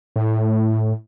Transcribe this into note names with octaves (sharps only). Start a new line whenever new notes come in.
A2